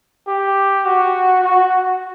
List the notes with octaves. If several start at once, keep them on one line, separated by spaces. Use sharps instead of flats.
G4
F#4
F#4